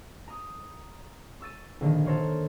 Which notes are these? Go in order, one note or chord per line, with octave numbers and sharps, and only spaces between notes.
A#5 D#6
C#6 E6 A6 D#7
A#1 D3 D#3
A4 A#4 C5 C#5